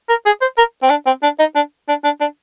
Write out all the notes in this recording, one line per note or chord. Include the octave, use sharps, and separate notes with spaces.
A#4
G#4
C5
A#4
C4
D4
C4
D4
D#4
D4
D4
D4
D4